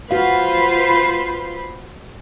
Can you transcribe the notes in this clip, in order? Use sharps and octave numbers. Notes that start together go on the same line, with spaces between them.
F4 F#4 B4 C5 F5